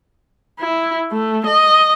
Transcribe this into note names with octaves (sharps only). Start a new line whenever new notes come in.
E4
A3
D#5